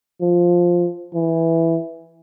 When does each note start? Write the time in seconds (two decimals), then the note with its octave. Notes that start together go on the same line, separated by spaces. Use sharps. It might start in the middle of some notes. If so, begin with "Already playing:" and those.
0.21 F3
1.14 E3